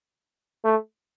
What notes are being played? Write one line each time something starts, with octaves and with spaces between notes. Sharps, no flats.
A3